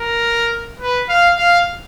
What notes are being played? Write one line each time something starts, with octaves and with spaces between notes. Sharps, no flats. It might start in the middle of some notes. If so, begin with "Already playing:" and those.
Already playing: A#4
B4
F5
F5